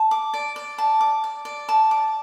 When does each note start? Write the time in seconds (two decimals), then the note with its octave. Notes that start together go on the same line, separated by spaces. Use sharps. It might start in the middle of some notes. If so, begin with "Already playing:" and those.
Already playing: A5
0.11 D6
0.34 D5
0.56 D5
0.78 A5
1.01 D6
1.24 D5
1.45 D5
1.69 A5
1.91 D6